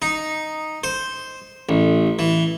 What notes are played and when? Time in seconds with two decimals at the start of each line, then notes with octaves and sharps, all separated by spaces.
0.02 D#4
0.84 C5
1.69 A1
2.19 E3